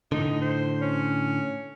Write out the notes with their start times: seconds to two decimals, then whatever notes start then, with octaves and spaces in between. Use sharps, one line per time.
0.12 A2 D3 D#4
0.42 C5
0.82 C#4